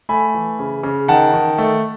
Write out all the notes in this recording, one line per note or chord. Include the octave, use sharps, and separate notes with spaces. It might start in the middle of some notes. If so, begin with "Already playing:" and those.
A3 G#5 B5
E3
C#3
C#3
D#3 F#5 A5
D#3
A3